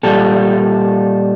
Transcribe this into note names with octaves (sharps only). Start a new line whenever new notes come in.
A#2 G3 A4